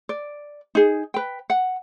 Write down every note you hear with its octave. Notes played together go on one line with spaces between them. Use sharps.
D5
D#4 G#4
B4 G5
F#5